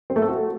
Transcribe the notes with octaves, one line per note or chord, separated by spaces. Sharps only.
C4
A3
A4
F#4